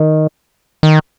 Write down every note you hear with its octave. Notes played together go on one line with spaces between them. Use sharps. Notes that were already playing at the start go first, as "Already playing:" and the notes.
Already playing: D#3
D#3